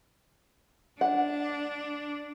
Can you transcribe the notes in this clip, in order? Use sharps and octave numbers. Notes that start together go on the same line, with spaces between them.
D4 F#5